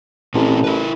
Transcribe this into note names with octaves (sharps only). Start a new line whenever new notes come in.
A1 A#2 C4 G4
E4 A#4 B4